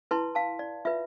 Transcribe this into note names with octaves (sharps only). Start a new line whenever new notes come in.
E4 B4 A5 C6
F5 A5
D5
F4 B4 E5